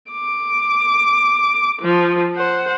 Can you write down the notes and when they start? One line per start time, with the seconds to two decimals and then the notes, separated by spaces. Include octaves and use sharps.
0.11 D6
1.82 F3
2.36 C5 F#5